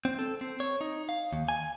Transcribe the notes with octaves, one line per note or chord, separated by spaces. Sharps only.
C4
A4
C4
C#5
D#4
F5
D#2
G#5